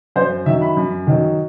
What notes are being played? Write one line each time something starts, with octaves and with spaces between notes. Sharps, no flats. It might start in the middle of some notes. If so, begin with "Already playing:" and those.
F#2 C5
D#3 F#3 E5
B5
F#2
D#3 F#3